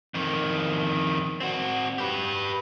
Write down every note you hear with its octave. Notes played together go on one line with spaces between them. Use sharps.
F2 D#3
C4 F#4
G4 B4